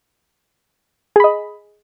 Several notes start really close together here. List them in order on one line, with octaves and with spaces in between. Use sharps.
G#4 B5 D#5